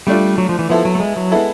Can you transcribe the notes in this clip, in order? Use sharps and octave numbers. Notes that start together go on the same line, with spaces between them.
G3 A3 D4 F4
F#3
F3
E3
F3 B3 E4 A4
F#3
A3
G#3
F#3
G#3 B3 E4 A4